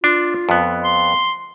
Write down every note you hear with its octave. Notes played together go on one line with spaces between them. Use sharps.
D4 F4
F2 B3
C6